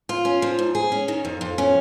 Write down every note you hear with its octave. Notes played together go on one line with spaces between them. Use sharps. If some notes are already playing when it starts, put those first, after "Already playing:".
F4
C#4
F3
G#2
G#4
C#4
D#3
F2
F2
C#4